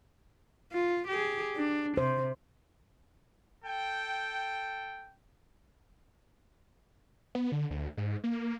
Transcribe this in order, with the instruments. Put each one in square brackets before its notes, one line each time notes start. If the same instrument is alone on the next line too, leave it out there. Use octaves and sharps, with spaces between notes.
[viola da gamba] F4
G4 G#4
D4
[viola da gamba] C3 [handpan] C5
[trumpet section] A4 G5
[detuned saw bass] B3
D3
D2
G#2
A#3